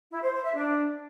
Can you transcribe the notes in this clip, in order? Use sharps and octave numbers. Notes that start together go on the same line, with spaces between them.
E4
C5
C5
E5
D4